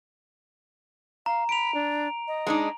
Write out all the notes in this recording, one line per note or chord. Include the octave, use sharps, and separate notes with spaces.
F5 A#5
B5 D7 F7
D4
D#5
G#3 D4 D#4